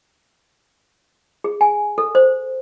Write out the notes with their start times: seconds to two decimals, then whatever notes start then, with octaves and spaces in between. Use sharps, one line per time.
1.44 G#4
1.61 G#5
1.98 A4
2.15 C5